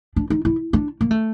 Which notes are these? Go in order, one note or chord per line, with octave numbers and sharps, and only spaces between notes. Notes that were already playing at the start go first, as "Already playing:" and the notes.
D4
D#4
E4
D4
A#3
A3